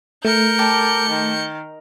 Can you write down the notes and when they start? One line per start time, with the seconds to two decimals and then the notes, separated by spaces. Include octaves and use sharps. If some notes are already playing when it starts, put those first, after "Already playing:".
0.25 A3 A#4 G6 C#7
0.59 G4 D5 A5
1.09 D#3